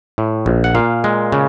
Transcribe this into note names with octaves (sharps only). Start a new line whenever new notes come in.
A2
A#1
F#5
A#2 F5
G#3
C#3